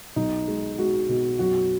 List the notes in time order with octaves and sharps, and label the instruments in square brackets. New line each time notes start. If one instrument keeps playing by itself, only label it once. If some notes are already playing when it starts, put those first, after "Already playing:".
[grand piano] B1 D#4
G#3
G#3 F#4
B2
F#2 F#4